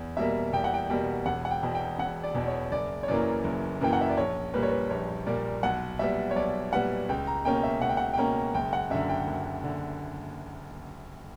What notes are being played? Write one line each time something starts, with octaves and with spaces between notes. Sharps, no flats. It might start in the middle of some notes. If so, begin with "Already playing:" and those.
Already playing: E2
B2 G3 A#3 E5
E2 G5
F#5
G5
B2 G3 A#3 G5
E1 F#5
F#5
G5
E2 B2
G5
E1 F#5
D5
E2 B2
C#5
F#1 D5
C#5
F#2 E3 A#3 D5
F#1
F#2 E3 A#3 G5
F#5
E5
D5
A#1 C#5
A#2 G3 A#3 B4
C#5
B4
A#1 C#5
A#2 G3 A#3 D5
B1 F#5
A#2 G3 B3 E5
C#5
B1 D5
A#2 G3 B3 F#5
C#2 G5
A#5
B2 A#3 C#4 G5
E5
C#2 F#5
G5
F#5
G5
B2 A#3 C#4 A#5
F#1 G5
F#5
F#2 D3 E5
G5
F#1
D3